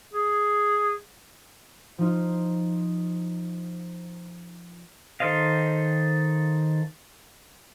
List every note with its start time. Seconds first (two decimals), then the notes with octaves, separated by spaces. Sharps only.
0.13 G#4
1.98 F3 D#4 F4
5.20 D#3 A4 C5 D#5 F5